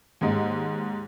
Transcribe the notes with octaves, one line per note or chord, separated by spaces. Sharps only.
D#2 G#2